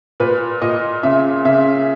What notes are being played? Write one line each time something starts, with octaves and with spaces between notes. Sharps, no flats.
A#2 B4
A#2 D#5
C#3 E5
C#3 E5